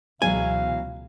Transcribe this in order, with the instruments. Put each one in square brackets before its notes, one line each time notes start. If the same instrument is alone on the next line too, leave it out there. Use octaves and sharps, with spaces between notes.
[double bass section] C#2 B2 [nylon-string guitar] E3 F#3 G#3 [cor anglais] F5 [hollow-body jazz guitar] G#5